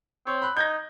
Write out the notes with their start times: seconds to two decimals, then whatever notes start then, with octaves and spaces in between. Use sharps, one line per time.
0.27 C4 C#5
0.42 B5 F#6
0.57 D#4 G6 G#6 A#6